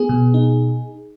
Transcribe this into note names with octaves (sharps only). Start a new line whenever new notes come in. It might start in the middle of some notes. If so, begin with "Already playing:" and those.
Already playing: B3 G#4
B2
D#4